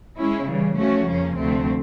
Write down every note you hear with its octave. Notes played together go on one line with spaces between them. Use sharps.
G#3 C#4 E4
C#3 E3 G3
F3 A3 C#4 F#4
F2 C#3 F3 A#3 C#4
D2 C3 F3 A3 C4